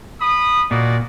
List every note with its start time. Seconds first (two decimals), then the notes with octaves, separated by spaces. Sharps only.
0.20 B5 D#6
0.71 A#2 F#4 D5 D#5